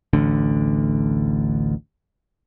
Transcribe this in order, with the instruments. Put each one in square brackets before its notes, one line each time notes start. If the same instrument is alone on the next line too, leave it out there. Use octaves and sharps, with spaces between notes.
[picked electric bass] A1 D2 D3